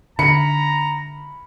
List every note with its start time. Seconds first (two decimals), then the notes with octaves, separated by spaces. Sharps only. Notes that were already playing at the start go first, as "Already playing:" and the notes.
0.19 D3 A#5 B5 C#7